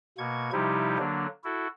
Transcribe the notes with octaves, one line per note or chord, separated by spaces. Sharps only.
B2 A#3 C#6 G#6
C3 F3 G3 D#4 E4 G4
D3 F#3 A#3 D4
E4 F#4 A4